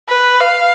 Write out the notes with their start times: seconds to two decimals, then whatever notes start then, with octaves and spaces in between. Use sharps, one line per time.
0.09 B4
0.40 F5